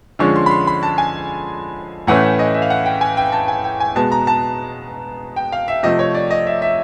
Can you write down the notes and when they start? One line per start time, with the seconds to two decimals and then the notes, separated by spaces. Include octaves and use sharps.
0.19 D3 F3 G#3 C#4 C#6
0.36 C6
0.46 B5
0.51 C6
0.67 B5
0.83 A5
0.98 G#5
2.07 A2 E3 A3 C#4 F#5
2.23 E5
2.39 D#5
2.54 E5
2.62 F5
2.70 F#5
2.86 G5
3.01 G#5
3.17 G5
3.32 A5
3.48 G#5
3.64 G5
3.80 G#5
3.95 B2 G#3 B3 A5
4.12 A#5
4.27 A5
5.36 G5
5.52 F5
5.68 E5
5.83 C3 F3 A3 D#5
5.99 C#5
6.15 D5
6.31 D#5
6.47 E5
6.62 E5